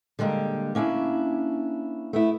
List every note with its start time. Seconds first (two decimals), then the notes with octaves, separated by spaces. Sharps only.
0.19 D3 G3 G#3 A#3
0.75 A#3 C#4 D4 E4
2.13 A3 B3 E4